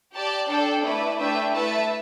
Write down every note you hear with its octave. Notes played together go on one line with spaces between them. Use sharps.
G4 D5 A5
D4 A4 D5 G5
A3 E4 B4 D5
A3 D4 B4 E5 G5
A3 E4 B4 E5 A5